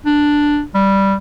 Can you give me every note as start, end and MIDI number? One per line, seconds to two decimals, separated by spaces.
0.05 0.63 62
0.74 1.15 55